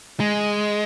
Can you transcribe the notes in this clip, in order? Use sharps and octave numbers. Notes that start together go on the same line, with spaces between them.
G#3